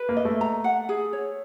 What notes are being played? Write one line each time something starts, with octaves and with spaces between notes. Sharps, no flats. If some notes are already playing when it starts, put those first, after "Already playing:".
Already playing: B4
A#3
D#5
A3
A#5
F#5
G#4
C#5